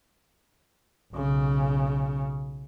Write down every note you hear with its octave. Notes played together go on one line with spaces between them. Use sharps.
B1 C#3